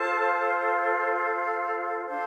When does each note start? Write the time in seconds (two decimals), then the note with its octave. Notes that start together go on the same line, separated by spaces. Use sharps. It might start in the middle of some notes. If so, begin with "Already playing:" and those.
Already playing: F4 A4 C5 A5
0.60 F5
2.05 D4 A4 C5 F5